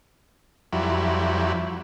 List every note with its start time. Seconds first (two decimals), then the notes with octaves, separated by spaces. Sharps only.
0.73 F2 F#3 G3 E4